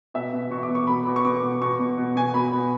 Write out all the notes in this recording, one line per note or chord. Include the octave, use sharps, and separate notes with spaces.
B2 E5
B2
B2 C#6
D6
B2
C#6
B2 B5
B2 D6
C#6
B2 D6
B2
B2 C#6
B2
B2
B2 G#5
B2 B5
B2